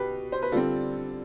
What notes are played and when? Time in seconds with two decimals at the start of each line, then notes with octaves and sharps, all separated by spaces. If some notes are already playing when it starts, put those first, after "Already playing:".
Already playing: B2 G4 B4
0.32 C5
0.43 B4
0.52 D3 G3 C4 F4 A4